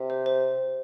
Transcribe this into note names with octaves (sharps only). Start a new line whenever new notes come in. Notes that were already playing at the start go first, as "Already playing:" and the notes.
Already playing: C3
C5
C5